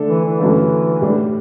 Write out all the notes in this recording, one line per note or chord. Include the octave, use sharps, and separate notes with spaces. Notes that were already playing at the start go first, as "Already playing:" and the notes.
Already playing: D3 A3 D4 A4
E3
E3
G2 D3 F#3 A3 C#4
A2 G3 D4